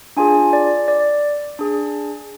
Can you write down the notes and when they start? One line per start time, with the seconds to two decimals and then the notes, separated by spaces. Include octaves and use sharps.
0.17 D4 F4 G#4 G#5
0.53 D5
0.88 D5
1.59 D4 G#4